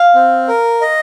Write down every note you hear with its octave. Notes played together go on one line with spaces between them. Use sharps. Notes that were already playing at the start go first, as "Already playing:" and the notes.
Already playing: F5
C4
A#4
D#5